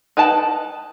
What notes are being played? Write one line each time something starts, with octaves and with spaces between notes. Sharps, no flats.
D#4 B4 G5 A5